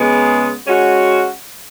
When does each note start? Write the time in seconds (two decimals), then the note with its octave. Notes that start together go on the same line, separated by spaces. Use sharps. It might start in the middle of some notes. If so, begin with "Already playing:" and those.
Already playing: C#3 G#3 B3 G#4
0.66 G#3 C#4 F#4